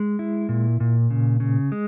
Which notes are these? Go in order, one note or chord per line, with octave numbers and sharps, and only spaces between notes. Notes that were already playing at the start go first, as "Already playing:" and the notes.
Already playing: G#3
E4
A#2
A#2
C#3
C#3
G#3